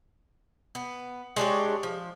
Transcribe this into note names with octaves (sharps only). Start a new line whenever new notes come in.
B3
G#3 D4 G4 C#5
F3